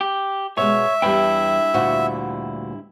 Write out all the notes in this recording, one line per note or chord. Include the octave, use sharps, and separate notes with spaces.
G4
B2 G#3 C#5 E5
E2 G2 G3 E4 G5
D2 A#2 F#4